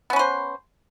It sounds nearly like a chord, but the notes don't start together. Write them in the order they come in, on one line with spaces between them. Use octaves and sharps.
B3 C#4 B4 C5